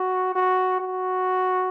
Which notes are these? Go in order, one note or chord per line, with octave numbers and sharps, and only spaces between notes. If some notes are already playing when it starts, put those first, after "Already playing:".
Already playing: F#4
F#4
F#4